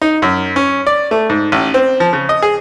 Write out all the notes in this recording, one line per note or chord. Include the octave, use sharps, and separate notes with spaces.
D#4
F#2
C#4
D5
A3
G#2
A1
C4
F3
C#3
D#5
G#4